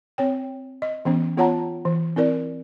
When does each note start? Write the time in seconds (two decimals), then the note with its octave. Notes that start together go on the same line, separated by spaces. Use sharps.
0.18 C4 C#5 G5
0.82 D#5
1.05 E3 B3 C#4
1.37 B3 F4 C#5 F#5 A5 A#5
1.85 E3
2.16 C4 E4 A#4 D5